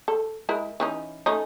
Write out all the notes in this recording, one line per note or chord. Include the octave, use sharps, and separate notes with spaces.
A4
G#3 E4 A#4
E3 C#4 D#4
A3 C#4 D#4